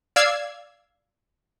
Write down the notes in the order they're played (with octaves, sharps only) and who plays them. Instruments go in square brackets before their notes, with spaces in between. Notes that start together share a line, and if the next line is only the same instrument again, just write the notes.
[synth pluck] D5 F5 E6 G#6 C7